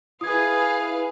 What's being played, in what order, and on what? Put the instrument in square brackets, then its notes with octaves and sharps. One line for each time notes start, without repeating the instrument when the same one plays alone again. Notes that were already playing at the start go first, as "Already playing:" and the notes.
[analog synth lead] E4 [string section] G#4 B4 F5 [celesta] D#6 G#6